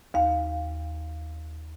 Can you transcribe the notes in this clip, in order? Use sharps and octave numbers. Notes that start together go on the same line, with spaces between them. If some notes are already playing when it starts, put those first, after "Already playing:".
D#2 F5